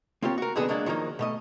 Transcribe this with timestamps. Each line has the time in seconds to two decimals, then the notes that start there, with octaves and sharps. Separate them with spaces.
0.23 A#3 C4 F4 G4 C#5
0.38 F#4 A#4
0.56 F2 A#2 D3 B3 G#4 A4
0.68 F#3 G#3 A#3 D4
0.86 D#3 F3 F#3 A#3 D#4
1.19 B2 A3 D#5